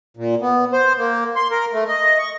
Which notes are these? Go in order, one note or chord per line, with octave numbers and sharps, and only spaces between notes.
A#2
B3
C5
A#3
C6
A#4
A3
D#5
C#6